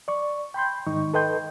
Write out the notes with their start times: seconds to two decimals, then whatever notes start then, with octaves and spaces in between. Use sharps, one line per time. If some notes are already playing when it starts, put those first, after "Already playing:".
0.08 D5 C#6
0.54 G5 B5 C6 G6
0.87 G#2 D#3 D#4 C#6
1.14 A4 B4 D#5 G5 C6 G6